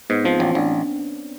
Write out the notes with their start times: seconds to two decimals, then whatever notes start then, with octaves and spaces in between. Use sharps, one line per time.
0.10 G#2 B3
0.25 F3 C4
0.40 A1 C#4
0.55 A1 D4